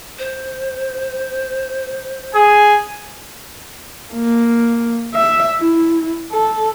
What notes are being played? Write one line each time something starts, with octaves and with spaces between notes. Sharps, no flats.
C5
G#4 G#5
A#3
E5
E4
A4